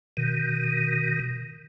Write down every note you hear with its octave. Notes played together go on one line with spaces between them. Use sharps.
B2 D#3